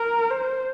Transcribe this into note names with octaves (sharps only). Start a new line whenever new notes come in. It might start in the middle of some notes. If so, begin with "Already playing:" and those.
Already playing: A#4
C5